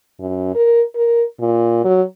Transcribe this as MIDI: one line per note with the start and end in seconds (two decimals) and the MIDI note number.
0.19 0.54 42
0.55 0.81 70
0.95 1.23 70
1.40 1.82 46
1.85 2.02 54